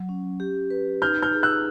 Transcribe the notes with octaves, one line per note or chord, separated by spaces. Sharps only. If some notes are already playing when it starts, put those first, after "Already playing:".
Already playing: F#3
C#4
G4
B4
D#4 F6 G6
F6 G6
G#4
E6 F#6